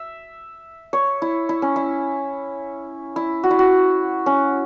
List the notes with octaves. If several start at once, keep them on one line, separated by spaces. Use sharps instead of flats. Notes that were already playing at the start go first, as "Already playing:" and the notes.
Already playing: E5
C#5
E4
E4
C#4
E4
E4
F#4
E4
F#4
C#4